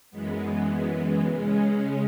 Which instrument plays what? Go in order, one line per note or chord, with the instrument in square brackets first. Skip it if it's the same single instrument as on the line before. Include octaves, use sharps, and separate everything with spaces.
[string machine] F#2 E3 G#3 B3
C#3 G#3 C#4